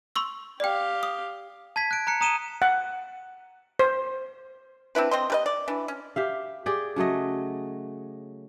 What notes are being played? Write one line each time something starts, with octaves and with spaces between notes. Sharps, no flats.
C6 C#6 E6
G4 D5 F5 G5
D#6
A5 G#6 B6
F#6 D7
A#5 F#6 C#7
A#5 D#6 D#7 E7 G7
F#5
C5
C4 D4 E4 B4
C4 D#5 C6
G3 B4 D#5
D5
E3 D4
C#4
G4 E5 F5
G4 G#4 D5
C#3 F#3 A3 D#5